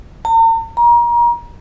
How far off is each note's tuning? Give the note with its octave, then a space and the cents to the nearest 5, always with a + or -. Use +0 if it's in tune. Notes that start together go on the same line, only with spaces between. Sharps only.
A#5 -45
A#5 +30